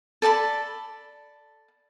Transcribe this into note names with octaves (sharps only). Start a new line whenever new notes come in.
A4 D5 A5 B5